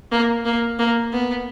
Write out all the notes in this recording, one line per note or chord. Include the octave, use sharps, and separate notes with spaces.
A#3
A#3
A#3
B3